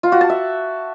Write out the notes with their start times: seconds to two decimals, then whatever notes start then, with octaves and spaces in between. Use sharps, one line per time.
0.03 F4
0.12 F#4
0.21 A5
0.30 E5